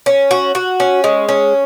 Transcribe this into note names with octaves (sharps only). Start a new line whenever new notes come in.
C#4
F#4
F#4
C#4
G#3
C#4